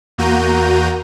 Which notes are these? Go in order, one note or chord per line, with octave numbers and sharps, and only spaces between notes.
E2 A#3 F#4 A#5 G6 D#7